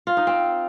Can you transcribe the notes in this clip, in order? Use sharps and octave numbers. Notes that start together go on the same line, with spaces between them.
F4
D#4
C4